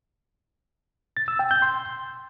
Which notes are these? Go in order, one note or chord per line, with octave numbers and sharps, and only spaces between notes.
A6
E6
G5
G6
C6